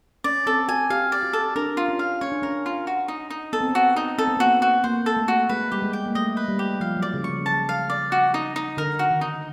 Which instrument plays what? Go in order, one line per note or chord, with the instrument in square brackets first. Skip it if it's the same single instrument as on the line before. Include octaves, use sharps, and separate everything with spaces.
[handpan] C#4 [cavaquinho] D5
[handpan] C4 [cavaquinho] A4
[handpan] F#4 [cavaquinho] G#5
[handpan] G4 [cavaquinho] F5
[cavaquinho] D5
[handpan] F#4
[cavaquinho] A4
[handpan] D4 [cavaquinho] A#4
[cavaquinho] F4
[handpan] C#4
[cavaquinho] F5
[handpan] C#4 [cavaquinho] C#5
[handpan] D4
[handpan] C#4 [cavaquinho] A#4
[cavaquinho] F4
F#4
D#4
D#4
[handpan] B3 [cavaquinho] A4
[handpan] C4
B3
[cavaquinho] F#4
D#4
[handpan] C4 [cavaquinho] A4
[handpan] B3
[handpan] A#3 [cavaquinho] F#4
[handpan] B3
[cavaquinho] F#4
[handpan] A#3 [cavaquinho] C5
[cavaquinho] A4
[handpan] A3
[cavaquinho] F#4
[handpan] G#3 [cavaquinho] B4
[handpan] G3 [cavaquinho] G4
[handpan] G#3
[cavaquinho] G5
[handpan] A#3
[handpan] A3 [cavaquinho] D#5
[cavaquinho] B4
[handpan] G3
[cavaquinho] G4
[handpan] F3 [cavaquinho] F5
[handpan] F#3
[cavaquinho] D5
[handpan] C#3
[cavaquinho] C#6
[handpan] C#3
[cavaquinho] A5
F5
D5
F#4
D#4
D#4
[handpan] D3 [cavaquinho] A#4
[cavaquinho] F#4
[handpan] D#3
[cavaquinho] D#4